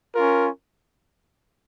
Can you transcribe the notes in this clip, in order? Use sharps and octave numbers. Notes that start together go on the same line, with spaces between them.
C#4 F4 A#4